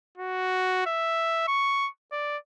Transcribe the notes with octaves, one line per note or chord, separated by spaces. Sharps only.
F#4
E5
C#6
D5